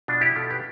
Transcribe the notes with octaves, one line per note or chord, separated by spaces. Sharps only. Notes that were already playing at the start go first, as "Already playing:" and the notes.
B2 D4 F4
E4 G4
B2 F4 A4
G4 B4